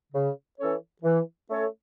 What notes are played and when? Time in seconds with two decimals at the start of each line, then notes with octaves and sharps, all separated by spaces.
0.13 C#3
0.58 E3 C#4 A4 C#5
1.02 E3
1.48 A3 C#4 A4 C#5